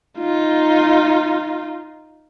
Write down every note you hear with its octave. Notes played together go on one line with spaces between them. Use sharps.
D#4 F4